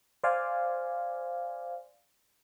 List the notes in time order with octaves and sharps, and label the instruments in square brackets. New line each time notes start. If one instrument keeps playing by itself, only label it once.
[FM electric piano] C5 D5 F5 G#5